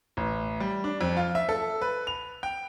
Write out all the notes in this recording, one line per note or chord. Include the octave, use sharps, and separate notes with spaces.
A1
G3
D4
F2
F4
E5
A4
B4
F7
G5